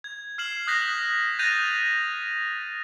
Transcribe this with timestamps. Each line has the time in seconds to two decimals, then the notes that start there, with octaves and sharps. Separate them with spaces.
0.04 G#6
0.38 F6 C7 E7 F#7
0.67 D#6 F#6 G6 A#6 B6 F#7
1.39 F#6 G6 A6 A#6 D#7 F7